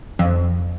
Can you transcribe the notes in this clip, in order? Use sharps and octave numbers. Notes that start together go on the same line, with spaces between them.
F2